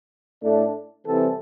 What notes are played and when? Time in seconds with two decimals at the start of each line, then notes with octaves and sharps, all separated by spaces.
0.42 A2 A3 D4
1.04 C2 C3 E3 C4 A4